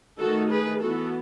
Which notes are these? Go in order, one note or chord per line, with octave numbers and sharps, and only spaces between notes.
D#3 A3 D#4 F#4 A4
G#4 B4
E3 B3 E4 F#4 A4